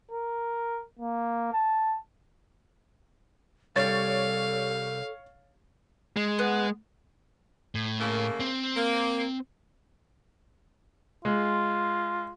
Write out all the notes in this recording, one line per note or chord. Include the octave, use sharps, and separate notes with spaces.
A#4
A#3
A5
C2 G3 A4 C#5 F5 A6
G#3
B3
A2
C#3 A3 A#3
C4
A#3
G#3 F4